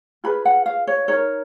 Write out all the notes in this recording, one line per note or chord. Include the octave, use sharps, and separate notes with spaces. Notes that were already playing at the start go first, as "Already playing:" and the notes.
F4 G#4 B4 B5
F#5
F5
C#5
D#4 A#4 C#5